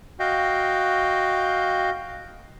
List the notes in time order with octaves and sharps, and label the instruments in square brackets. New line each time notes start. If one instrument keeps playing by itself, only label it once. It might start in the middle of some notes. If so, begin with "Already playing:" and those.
[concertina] F#4 D#5 F5 G5